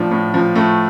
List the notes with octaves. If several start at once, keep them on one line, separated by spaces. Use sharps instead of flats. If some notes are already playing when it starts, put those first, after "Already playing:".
Already playing: A2 F3 D4
A2
F3
A2 A3